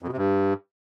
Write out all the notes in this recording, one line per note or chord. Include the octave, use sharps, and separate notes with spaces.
F2
B2
C3
G2